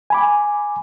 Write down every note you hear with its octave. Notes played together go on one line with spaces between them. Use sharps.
G#5 B5 D6